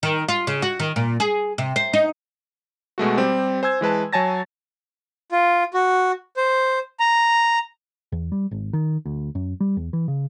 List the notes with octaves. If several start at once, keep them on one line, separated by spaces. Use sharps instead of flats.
D#3
F4
C#3
F#4
D#3
A#2
G#4
C3
C5
D#4
B2 G#3 A3 F#4
G3 C4 G4
C5 G#5 E6 G#6
E3 G#3 B4 A5
F#3 C#5 G#5 A5 A6 A#6
F4
F#4
C5
A#5
E2
G3
G#1
D#3
D2
F#2
G3
E2
E3
C#3